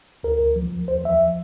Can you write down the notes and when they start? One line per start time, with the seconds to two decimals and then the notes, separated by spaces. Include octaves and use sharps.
0.24 D2 A#4
0.40 D2
0.56 F3
0.73 D2
0.88 E2 C5
1.04 F3 E5